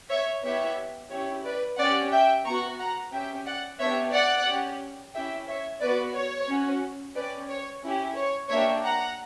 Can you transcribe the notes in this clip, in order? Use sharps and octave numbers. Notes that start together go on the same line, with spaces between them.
C#5 E5
B3 E4 G4 C#5 E5
C#4 E4 G4 C#5
B4 D5
C#4 G4 D5 F#5
E5 G5
B3 F#4 A#5 C#6
F#5 A#5
C#4 G4 E5 G5
D5 F#5
B3 D4 G4 C#5 E5
D5 F#5
C#4 G4
C#4 E4 G4 E5 G5
C#5 E5
B3 F#4 B4 D5
C#5
C#4 F#4
C#4 G4 B4 D5
C#5
C#4 E4 G4
C#5
A#3 D4 G4 C#5 E5
F#5 A#5